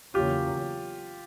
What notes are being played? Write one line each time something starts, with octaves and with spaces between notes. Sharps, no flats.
E2 C#3 F#3 A#3 C#4 F4 G4